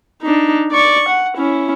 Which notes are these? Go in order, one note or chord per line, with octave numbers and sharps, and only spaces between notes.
D4 D#4
D5 C#6
F#5
C#4 E4